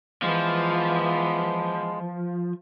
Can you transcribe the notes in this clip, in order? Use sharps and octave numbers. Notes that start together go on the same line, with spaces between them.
E3 F3 G#3 B3